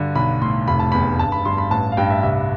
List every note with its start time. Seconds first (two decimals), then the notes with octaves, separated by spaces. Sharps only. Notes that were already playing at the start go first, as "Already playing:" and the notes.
Already playing: G2 D3
0.15 B1 B5
0.41 A2 C6
0.67 F1 B5
0.79 A5
0.92 E2 B5
1.19 G1 A5
1.32 B5
1.45 G2 C6
1.58 B5
1.71 A1 A5
1.92 F5
1.97 G2 G5
2.10 E5
2.23 C2 E5